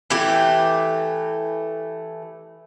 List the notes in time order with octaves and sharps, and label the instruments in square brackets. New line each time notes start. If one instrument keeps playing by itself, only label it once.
[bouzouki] E3 A3 G4